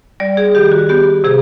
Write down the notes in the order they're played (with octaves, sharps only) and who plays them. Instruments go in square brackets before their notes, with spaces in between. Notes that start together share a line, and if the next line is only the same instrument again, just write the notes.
[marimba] G3 D5
G#4
D#3 G4
F#4
B3 G4
C3 G#4